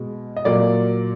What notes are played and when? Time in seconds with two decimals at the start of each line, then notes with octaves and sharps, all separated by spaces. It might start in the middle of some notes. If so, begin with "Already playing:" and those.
Already playing: B2 G#3
0.37 D#5
0.45 A#2 F#3 A#3 D5